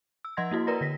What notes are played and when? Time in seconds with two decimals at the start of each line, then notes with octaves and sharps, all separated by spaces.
0.25 E6
0.37 F3 D#5 F#5 C6 G#6 A#6
0.51 A#3 E4 F#4
0.67 A#4 B4 D5 A#5 A#6
0.81 D3 A#6 B6